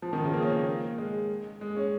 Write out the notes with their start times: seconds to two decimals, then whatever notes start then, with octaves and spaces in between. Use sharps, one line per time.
0.02 F3
0.13 D#3
0.24 C#3
0.34 A#3
0.42 C#4
0.50 A#3
0.98 G#3
1.61 G#3
1.77 C#4